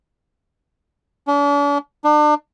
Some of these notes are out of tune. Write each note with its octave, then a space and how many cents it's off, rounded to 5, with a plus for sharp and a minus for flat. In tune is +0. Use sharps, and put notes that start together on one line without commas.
D4 -45
D4 +35